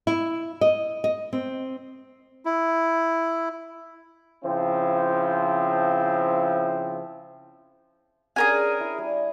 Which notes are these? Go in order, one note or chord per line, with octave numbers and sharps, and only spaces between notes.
E4
D#5
D#5
C4
E4
C#3 F3 C4 E4
C#4 D4 G4 G#4 A#4 G#5
E4
G3